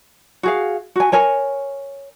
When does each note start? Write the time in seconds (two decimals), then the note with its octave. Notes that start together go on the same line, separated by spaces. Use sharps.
0.43 F#4 G#4 F5
0.96 F#4 G#5
1.12 A#4 C#5 G#5